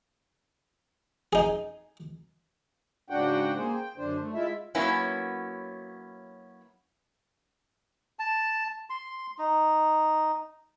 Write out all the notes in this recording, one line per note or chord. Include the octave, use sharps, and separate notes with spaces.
D#4 G#4
G#2 C#3 D4 F#4 F#5 G5
A#3 G#4 C5
G5
F#2 D3 D4 C5
A3
G#3 E4 F4 E5
F#3 A#3 B3 C#4 E4
A5
C6
D#4